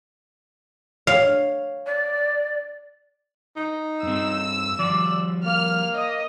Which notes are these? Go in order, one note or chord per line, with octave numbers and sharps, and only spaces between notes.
C#5 F5
D5
D#4
G2 C4 E6
F3 G3 D5
A#3 F6
D#5